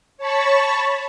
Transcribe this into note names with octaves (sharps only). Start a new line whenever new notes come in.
C#5 A5 B5 C#6